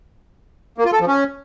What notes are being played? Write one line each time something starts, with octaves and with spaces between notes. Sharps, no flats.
A#3
F4
A4
F3
C#4